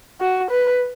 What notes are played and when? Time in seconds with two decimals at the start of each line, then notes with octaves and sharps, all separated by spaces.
0.21 F#4
0.51 B4